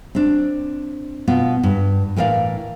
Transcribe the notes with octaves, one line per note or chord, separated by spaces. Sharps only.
C4 D4
B2 B3 F4
G2
A2 E3 A#4 D5 F5